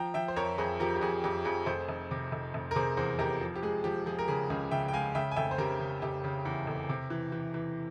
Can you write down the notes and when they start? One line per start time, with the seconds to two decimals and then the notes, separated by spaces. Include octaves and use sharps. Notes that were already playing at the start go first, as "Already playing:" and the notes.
Already playing: F3 G5 A#5
0.14 F3 E5 G5
0.28 C5
0.36 F2 A#4 C#5
0.58 F2 G#4 C5
0.80 F3 G4 A#4
0.96 G4
1.01 F2 G#4
1.24 F2 G4
1.45 F2 G#4
1.66 F1 G#4 C5
1.89 F1
2.11 C3
2.32 F1
2.54 F1
2.71 A#4
2.76 C3 G#4 C5
2.97 E2 G#4 C5
3.19 F1 G4 A#4
3.41 F3
3.56 G4
3.62 G#3 G#4
3.84 F3 G4
4.06 F3 G#4
4.19 A#4
4.28 C#3 G#4
4.50 C#2 G#4
4.71 C#3 E5 G5
4.88 G5
4.94 G#3 F5 G#5
5.15 C#3 E5 G5
5.31 G#5
5.36 F1 E5 G5
5.51 C5
5.58 C#3 G4 A#4
5.80 C#3
6.02 F1 G4
6.24 C#3
6.45 E2
6.67 F1
6.89 C3
7.10 E3
7.32 E3
7.54 E3